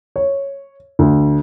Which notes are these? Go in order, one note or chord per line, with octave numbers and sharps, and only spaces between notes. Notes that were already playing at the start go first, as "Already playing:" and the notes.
C#5
D2